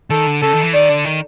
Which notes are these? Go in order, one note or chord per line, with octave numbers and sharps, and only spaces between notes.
D#3 A4
D3
C#3 A4
D#3
E3
D#3 D5
D3
D#3